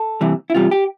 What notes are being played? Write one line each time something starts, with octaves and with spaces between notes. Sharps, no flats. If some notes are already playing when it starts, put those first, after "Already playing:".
Already playing: A4
C3 E3 G3 C4
E4
E2 C3 G3 F4
G4